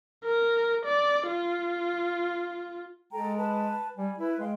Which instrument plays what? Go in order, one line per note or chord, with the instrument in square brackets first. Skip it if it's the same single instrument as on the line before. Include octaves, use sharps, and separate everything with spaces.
[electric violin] A#4
D5
F4
[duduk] G#3 [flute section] A4 G5 A#5
[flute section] B4 A5
[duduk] G3 [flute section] G#5
[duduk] E4 [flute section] B4
[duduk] G#3 [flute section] F5 G5 C6